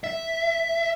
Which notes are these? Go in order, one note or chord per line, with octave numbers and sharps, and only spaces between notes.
E5